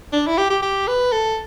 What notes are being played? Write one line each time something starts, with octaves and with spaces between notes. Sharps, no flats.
D4
E4
G4
G4
G4
B4
A4